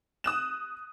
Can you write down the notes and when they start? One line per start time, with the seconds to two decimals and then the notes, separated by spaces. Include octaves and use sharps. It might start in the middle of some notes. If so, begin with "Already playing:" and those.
0.24 D#6 F#6 E7